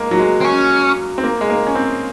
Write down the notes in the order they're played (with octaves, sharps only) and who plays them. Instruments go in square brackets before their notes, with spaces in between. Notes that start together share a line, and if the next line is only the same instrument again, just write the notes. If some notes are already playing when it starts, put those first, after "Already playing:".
Already playing: [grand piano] G#3 A#3
F#3
G#3
[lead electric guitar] C4
C#4
[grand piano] C4
A#3
G#3
A#3
C#4
C4